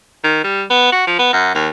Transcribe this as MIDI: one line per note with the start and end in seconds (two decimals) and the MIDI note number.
0.24 0.42 51
0.44 0.63 55
0.70 0.92 59
0.92 1.05 66
1.07 1.16 53
1.19 1.29 59
1.33 1.52 42
1.55 1.69 39